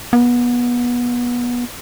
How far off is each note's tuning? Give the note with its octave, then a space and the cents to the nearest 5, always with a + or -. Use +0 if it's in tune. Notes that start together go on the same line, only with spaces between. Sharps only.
B3 -25